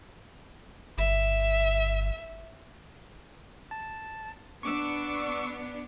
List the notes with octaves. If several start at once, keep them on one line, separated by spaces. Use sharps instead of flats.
G1 E5
A5
B3 D4 C#6 D6 E6